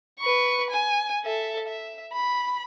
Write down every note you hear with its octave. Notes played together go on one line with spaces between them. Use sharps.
B4 C#6
G#5
A4 E5
E5
B5